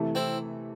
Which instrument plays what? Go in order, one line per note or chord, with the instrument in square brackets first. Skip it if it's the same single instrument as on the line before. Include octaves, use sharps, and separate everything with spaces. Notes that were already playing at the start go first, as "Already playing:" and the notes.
Already playing: [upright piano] C3 E3 A3
[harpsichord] C4 E4